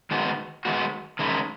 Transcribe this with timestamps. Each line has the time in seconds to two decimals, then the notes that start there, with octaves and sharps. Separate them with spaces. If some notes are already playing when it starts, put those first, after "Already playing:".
0.11 D#3 G#3 B3 F#4
0.65 D#3 G#3 B3 F#4
1.19 D#3 G#3 C#4 E4